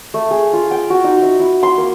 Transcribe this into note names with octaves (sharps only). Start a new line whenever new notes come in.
A3
G#4
F4
G5
F#4
D#4
E5
E4
C6
A#3